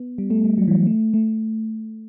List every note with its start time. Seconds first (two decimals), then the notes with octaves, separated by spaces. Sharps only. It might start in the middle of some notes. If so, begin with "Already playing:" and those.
Already playing: B3
0.18 G3
0.30 A3
0.44 G3
0.58 F#3
0.68 E3
0.73 F#3
0.87 A3
1.14 A3